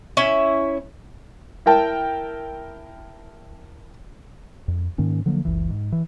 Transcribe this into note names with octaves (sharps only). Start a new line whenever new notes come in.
C#4 E4 E5
E4 A#4 G5 A5
F2
G#2 D#3 A#3 C#4
D3 F3 F#3 A#3
F#1 C#2 E3
G#2
E3